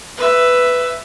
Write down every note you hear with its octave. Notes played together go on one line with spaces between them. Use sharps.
B4 E5